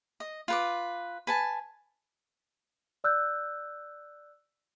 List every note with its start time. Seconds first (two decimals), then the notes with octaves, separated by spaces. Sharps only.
0.20 D#5
0.48 F4 B4 D6
1.27 B4 G#5 A5
3.04 D5 E6 F#6 G6